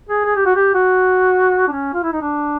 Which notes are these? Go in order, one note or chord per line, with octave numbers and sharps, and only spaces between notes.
G#4
G#4
G4
F#4
G4
F#4
D4
C#4
F4
E4
D#4
D4